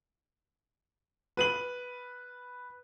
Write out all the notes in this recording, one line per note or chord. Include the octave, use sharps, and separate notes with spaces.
B4 D#7 F#7